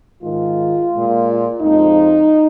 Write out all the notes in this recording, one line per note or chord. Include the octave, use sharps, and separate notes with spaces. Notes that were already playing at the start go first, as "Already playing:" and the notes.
G#2 D#3 G#3 F4
A#2 G#3
F2 F3 G#3 D#4